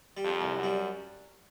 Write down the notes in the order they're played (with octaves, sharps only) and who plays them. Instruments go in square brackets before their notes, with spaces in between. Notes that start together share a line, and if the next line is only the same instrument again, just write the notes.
[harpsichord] G3
[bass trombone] F2
[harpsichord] C2
[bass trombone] F#2
[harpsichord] G3